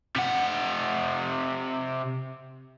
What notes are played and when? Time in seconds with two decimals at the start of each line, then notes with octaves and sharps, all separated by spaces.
0.16 C3 F#5